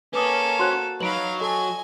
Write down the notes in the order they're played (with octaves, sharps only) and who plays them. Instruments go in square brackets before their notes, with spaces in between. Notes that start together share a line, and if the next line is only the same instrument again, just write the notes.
[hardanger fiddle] A#3 A4 [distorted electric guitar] C#4 [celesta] B4 D6 D#6
[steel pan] F#4 C5 [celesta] C6 F#6
[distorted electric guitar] F#3 [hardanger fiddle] D#4 F5 [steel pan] B4 A#5 B5 [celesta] D7 F#7
[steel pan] A4 C6 [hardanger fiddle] D#5 G#5